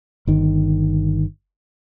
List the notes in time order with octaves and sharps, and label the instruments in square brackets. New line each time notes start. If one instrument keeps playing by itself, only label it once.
[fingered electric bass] G1 D#3